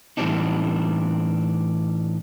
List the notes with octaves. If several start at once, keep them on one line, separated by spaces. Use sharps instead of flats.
A2 E3 G3 C4 D4 D#4